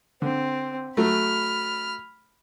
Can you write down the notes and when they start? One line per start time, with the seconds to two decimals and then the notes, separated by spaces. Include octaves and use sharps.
0.22 D3 C4
0.97 F#3 A3 B5 F6